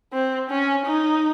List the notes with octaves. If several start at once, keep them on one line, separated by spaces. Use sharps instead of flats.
C4
C#4
D#4